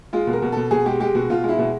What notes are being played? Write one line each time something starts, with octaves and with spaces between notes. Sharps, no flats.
G#3 F4
B2
A#4
B2
B2 A4
B2 G#4
G#3 G4
G#3 G4
B2 F#4
B2 F4
G#3
E4
B2